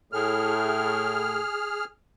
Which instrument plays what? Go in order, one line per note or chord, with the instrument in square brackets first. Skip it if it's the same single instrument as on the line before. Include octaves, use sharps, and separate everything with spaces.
[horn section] A2 [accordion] G#4 F6